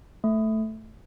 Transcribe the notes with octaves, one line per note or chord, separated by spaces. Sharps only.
A3